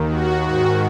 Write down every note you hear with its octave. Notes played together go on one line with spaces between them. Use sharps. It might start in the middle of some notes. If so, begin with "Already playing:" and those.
Already playing: D#2 D#3
F#4
G#2 D#3 F#4